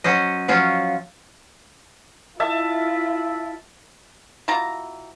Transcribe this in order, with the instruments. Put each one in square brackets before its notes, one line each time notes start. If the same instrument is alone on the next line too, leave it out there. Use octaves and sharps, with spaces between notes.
[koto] F#3 C#4 C5 D#5
F3 F#3 C#4 F4
[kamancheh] E4 F4 [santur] E5 A5
[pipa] B2 E3 F4 A#5